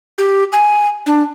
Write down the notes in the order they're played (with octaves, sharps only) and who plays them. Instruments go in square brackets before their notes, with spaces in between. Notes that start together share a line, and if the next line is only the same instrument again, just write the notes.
[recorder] G4
G#5
D4